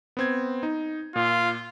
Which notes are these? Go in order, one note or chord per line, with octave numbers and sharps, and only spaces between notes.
B3 C4 G#6
D#4
A#2 F4